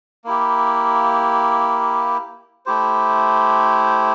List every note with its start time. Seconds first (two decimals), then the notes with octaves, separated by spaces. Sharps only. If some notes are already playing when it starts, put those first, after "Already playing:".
0.25 A#3 E4 G4
2.66 A3 E4 G4 C5